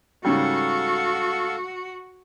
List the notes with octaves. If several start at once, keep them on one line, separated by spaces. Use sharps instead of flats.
G#2 C#3 G3 F#4 A4 F5 C#6